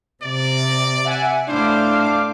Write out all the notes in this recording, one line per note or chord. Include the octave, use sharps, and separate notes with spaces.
C3 D5
E5 F#5 G#5
A2 D4 E4 C5 F5 D6
D6